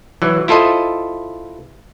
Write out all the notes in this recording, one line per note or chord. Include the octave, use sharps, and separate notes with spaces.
E3 F#3
E4 F4 A4 C5 D#5